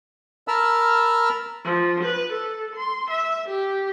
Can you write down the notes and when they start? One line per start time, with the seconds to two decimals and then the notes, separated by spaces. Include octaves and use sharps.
0.48 A#4 A5 B5 E6 F6
1.64 F3
2.03 B4
2.33 A4
2.75 C6
3.09 E5
3.47 G4